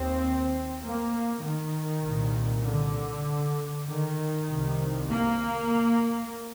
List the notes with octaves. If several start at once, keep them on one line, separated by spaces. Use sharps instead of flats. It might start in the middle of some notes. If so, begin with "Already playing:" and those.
Already playing: D#2 C4
A#3
D#3
C2 A#2
D3
D#3
C2 C3
A#3